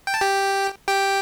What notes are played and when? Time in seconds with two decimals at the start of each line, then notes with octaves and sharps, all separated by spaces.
0.07 G5
0.14 A5
0.21 G4 G5
0.87 G4 G5